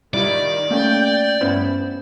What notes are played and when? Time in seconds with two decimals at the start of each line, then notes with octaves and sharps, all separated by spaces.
0.14 D#3 G3 E4 F4 D5
0.71 A3 A#3 C#4 G5
1.41 G2 B3 C#4 E4 C5